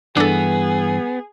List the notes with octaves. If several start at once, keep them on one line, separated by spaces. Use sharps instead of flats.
G2 E3 B3 D4 G#4 A4